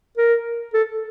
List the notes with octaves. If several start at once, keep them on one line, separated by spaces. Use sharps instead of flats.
A#4
A4